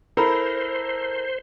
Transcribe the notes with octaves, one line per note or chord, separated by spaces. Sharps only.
E4 A4 A#4 C5 A#5 B5